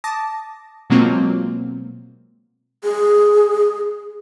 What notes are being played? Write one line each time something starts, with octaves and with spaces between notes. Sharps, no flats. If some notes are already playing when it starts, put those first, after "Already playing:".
A5 D6 D#6 A6 A#6
B2 F#3 G#3 A#3 C4 F4
G#4